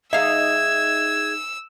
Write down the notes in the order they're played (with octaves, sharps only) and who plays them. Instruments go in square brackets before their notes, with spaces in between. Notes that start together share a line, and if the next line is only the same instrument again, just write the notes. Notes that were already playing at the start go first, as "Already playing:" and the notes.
[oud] D#4 F5 [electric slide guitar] G#4 E5 [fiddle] E6 [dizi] G#6